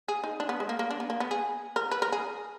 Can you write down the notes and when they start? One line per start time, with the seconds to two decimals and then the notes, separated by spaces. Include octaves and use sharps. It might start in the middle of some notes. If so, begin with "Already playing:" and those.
0.08 G#4
0.24 D#4
0.40 D4
0.49 B3
0.60 G#3
0.69 A#3
0.79 A#3
0.90 D4
1.00 B3
1.10 A#3
1.20 B3
1.31 G#4
1.76 A#4
1.91 B4
2.02 A#4
2.12 G#4